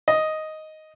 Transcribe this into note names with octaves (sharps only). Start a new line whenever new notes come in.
D#5